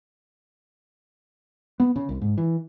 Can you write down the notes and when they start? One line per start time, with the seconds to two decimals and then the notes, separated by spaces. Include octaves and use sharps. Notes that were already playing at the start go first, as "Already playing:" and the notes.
1.80 B3
1.96 C#3
2.09 C2
2.21 G#2
2.38 E3